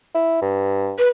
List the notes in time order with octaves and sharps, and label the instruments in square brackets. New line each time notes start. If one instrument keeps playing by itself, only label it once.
[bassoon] E4
G2
[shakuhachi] B4